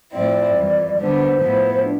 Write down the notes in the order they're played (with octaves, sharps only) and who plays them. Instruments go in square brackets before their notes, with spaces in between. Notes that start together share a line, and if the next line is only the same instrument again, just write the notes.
[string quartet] A2 F3 C4 E4 [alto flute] D5
[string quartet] F2 E3 G3
[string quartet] D3 G3 B3 D4 [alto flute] C5
[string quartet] A2 F3 B3 E4
[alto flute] D4